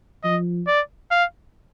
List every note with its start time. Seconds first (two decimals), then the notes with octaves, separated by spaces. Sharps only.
0.24 F3 D#5
0.67 D5
1.11 F5